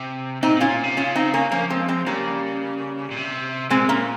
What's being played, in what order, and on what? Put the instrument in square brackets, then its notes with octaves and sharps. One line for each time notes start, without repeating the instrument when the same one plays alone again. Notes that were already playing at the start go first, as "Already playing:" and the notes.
Already playing: [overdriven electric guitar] C3
[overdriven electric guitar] A#2 [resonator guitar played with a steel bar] C4 D#4
[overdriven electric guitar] A#2 [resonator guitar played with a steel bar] C#4 F4
[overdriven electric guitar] A#2
C3
[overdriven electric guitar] C#3 [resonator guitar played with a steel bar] C#4 F4
[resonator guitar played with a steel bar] C4 D#4
A#3 C#4
[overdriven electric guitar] F3 [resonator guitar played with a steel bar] A#3 C#4
[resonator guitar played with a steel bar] G#3 C4
G#3 C4
[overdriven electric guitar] C#3 [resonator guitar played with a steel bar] G3 A#3
[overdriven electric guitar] A#2
C3
[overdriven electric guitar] A#2 [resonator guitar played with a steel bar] G#3 C4
[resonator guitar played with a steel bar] A#3 C#4